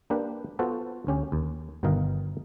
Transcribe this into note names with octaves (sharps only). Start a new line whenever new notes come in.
A#3 D4 G4 B4
B3 F4 F#4 A4 C5
D2 C#4 G4
D#2
G1 B2 D#3 D#4 F5